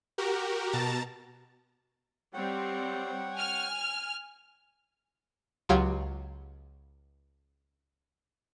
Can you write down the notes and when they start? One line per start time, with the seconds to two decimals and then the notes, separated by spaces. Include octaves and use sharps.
0.18 F#4 G4 A#4
0.73 B2 A5 A#5 A6
2.34 G3 C4 C#5 F#5 G5
3.34 G#5 F6
5.69 C#2 F#3 F4 G4 G#6